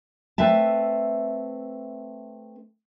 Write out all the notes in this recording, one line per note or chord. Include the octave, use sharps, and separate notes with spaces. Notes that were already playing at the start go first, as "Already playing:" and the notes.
A3 C4 B4 E5 A5